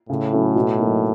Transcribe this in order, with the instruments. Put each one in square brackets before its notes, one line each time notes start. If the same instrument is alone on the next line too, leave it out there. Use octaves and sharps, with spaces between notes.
[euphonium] A2 [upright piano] C#3
[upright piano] F#3 A3 C#4 E4
B2
F#3 A#3 D#4